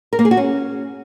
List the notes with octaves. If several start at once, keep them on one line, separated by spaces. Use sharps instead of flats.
A#4
A#3
G#4
F#4
C#4